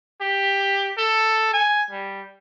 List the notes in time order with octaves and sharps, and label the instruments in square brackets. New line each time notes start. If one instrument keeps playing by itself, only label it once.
[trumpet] G4
A4
G#5
G3